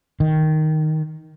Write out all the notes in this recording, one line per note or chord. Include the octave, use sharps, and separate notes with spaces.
D#3